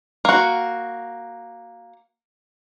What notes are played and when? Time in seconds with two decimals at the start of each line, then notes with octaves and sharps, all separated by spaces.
0.25 A#3 F#4